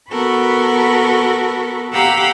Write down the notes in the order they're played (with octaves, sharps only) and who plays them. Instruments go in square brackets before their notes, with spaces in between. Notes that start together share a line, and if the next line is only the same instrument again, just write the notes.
[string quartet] B3 F#4 A4 A#4 B5
G4 F5 F#5 A#5 B5 E6